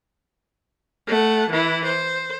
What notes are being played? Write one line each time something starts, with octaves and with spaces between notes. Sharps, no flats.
A3 F#5
E3 E4
C5